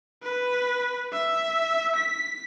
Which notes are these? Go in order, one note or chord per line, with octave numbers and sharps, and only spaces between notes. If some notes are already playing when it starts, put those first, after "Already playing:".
B4
E5
B6